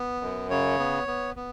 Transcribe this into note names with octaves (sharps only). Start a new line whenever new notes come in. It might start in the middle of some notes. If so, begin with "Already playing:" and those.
Already playing: B3
F#2
C#3 C#5
B3
B3
B3